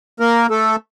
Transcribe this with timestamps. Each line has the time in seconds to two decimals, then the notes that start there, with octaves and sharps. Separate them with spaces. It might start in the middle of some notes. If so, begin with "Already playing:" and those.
0.20 A#3 A#4
0.49 A3 A4